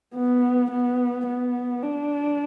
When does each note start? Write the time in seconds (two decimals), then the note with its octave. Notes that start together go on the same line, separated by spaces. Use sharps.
0.15 B3
0.71 B3
1.27 B3
1.82 D4